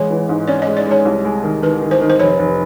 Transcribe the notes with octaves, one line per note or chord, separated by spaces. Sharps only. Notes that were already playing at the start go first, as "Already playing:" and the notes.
Already playing: A1 G#3 C#5
E3
G#2
C#4 D5
D#5
G#3
D5
G#3 C#5
C2
G#3
D#3
D#3 B4
D#3
C5
D#3
C5
F1 C#5
F1